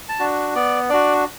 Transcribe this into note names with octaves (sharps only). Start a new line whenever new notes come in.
A5
D4 F#4
B3 D5
D4 F#4 D5